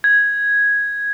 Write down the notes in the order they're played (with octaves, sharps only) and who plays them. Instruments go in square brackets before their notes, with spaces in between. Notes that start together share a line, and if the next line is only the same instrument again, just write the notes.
[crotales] G#6